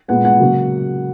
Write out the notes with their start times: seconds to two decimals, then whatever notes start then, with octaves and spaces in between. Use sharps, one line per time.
0.08 A#2 G#3 B3 F#5
0.25 F#5
0.40 C#3 F#3 A#3